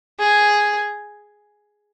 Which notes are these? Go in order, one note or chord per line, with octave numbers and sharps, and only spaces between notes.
G#4